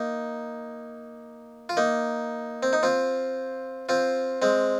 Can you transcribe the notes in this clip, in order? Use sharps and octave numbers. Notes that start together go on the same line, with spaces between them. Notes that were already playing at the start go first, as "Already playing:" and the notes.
Already playing: A#3 D#4
F4
A#3 D#4
C4
D#4
C4 F4
C4 F4
G#3 C4